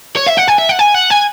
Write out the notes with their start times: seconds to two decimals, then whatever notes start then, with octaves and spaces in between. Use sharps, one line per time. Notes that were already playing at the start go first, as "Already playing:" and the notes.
0.17 C#5
0.27 E5
0.38 F#5
0.48 G#5
0.58 E5
0.69 F#5
0.79 G#5
0.95 F#5
1.11 G#5